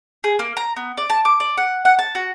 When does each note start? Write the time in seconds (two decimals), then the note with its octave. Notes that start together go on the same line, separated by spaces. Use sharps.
0.24 G#4
0.39 A#3
0.57 A#5
0.76 B3
0.97 D5
1.10 A5
1.25 D6
1.40 D5
1.57 F#5
1.85 F#5
1.99 A5
2.15 F#4